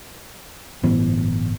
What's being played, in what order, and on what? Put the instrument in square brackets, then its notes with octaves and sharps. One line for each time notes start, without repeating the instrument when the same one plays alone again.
[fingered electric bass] G1 A2 E3 B3